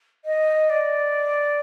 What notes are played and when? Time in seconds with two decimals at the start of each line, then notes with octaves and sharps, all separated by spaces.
0.25 D#5
0.69 D5